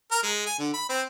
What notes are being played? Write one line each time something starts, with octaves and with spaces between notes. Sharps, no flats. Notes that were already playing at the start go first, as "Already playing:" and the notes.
A#4
G#3
G#5
D3
B5
C4